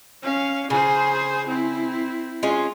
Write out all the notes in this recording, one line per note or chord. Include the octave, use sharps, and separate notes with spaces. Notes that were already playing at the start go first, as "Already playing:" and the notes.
C#4 F5
C#3 G#4 C5
C4 E4
G#3 C#4 F4